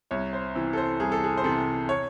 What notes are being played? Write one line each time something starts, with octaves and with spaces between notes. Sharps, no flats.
C2 C#5
C5
C3 E3
A4
C5
C2 G#4
A4
G#4
C5
C3 E3 A4
C#5